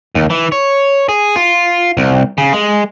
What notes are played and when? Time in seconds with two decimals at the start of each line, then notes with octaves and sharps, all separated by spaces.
0.15 D#2
0.30 E3
0.52 C#5
1.09 G#4
1.36 F4
1.97 C2
2.38 C#3
2.53 G#3